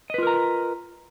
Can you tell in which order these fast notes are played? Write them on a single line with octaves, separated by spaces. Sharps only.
D#5 B4 F4 A#4 A#5